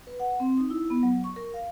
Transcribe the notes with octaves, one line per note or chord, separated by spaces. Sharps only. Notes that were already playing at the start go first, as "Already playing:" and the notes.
B4
F#5
C4
D#4
E4
B3
F#3
C#6
A#4
F5